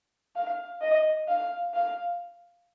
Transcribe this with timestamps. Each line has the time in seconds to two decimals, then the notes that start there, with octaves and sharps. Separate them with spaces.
0.36 F5
0.81 D#5
1.28 F5
1.74 F5